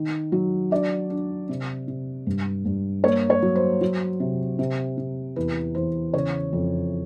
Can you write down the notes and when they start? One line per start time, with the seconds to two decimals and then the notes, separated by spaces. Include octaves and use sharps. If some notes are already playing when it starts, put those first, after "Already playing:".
Already playing: D#3
0.32 F#3
0.71 D4 D5
1.10 D4
1.49 C3
1.88 C3
2.27 G2
2.65 G2
3.04 A#3 C#5
3.30 C#5
3.42 F#3
3.55 C5
3.81 F#3
4.20 C3
4.59 C3
4.97 C3
5.36 E2 B4
5.75 E2 C5
6.14 C#3 C#5
6.53 F2